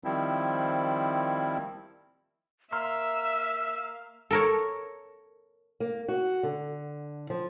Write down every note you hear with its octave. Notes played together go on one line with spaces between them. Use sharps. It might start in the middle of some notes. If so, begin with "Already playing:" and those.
D#3 F3 G3 C4 E4
A#3 E5 F5 A#5 C6 E6 F6
A4 A#4 C#5
A#3
F#4
D3
F3